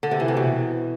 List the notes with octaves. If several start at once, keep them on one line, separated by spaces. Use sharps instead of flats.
D3
C3
E3
C3
B2